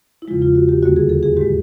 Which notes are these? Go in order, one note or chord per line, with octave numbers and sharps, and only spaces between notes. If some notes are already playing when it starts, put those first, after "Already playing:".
E4
E2 C#3 F3 G#3 F4
F4
F#4
G4
D#2 D3 G3 A#3 F#4
G#4
A4
G#4
G#2 D#3 G#3 G4